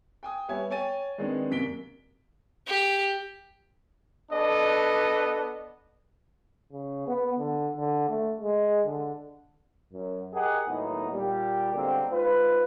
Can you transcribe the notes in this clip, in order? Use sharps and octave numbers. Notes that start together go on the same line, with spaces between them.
G5 G#5 D#6
G3 B3 C#5 E5 G#5 G#6
C#5 G5 G#5 A6 D#7
D#3 G#3 B3 C4 D4
F#2 C3 A#3 B6 D7 G7
G4
B3 D4 A4 D5 D#5
C#3
B3
D3
D3
A3
G#3
D3
F#2
G4 G#4 A#4 D#5 F#5
D#2 A2 F#3 B3 D#4
A#2 G3 G4
B2 D3 G3 G#3 A#3 C4
G#2 F4 B4